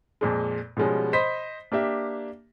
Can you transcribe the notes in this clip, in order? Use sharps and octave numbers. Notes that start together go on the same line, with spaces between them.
F2 A#2 G#3
B2 F3 G3 G#3 C#4
C5 D#5 B5 B6
A#3 D4 G4 E5